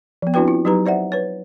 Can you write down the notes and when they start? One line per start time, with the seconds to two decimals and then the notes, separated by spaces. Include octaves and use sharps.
0.22 F3 B3
0.34 C4 D4 E4 F#4 B4 G5
0.48 E4 F4
0.65 F#3 D#4 G4 B4 A#5
0.86 C5 D5 E5 F#5
1.12 B4 C#5